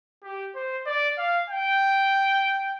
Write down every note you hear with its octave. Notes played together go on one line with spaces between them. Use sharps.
G4
C5
D5
F5
G5